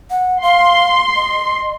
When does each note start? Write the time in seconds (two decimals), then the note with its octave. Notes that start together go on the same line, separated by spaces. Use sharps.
0.10 F#5
0.43 F5 C6
1.16 D#5